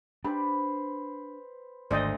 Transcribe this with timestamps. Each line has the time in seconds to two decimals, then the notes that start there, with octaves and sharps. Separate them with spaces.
0.25 D4 G4 B4 C5
1.91 G#1 D2 C5 D5 D#5